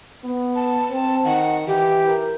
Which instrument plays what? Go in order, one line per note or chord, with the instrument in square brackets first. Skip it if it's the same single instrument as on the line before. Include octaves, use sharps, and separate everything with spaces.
[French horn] B3
[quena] A5
[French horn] C4
[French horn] D#3 [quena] F#5
[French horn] E3 [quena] G4
[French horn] A#4